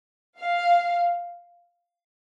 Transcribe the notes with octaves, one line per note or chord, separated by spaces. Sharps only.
F5